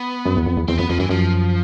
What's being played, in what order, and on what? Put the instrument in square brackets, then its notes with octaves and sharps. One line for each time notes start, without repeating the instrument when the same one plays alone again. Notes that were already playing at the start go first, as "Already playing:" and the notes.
Already playing: [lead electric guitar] B3
[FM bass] F#2
E2
F2
E2
[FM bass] E2 [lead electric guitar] C4
[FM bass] F2 [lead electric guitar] B3
[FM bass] F2 [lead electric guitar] F3
[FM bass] F#2 [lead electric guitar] E3
[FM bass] F#2 [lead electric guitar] F3